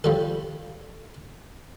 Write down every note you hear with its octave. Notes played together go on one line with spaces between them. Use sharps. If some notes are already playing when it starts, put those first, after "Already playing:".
F3 G3 A4